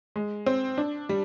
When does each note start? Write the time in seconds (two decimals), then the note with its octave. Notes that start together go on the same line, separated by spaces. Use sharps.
0.16 G#3
0.46 C4
0.78 D4
1.09 G3